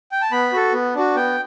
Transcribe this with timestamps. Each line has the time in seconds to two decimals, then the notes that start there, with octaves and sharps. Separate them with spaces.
0.12 G5
0.21 A5
0.31 B3 B5
0.53 F#4 A4
0.73 B3
0.95 D4 F#4
1.15 B3 G5